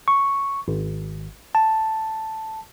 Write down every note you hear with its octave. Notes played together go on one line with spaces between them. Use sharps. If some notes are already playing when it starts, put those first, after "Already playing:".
C#6
G#1
A5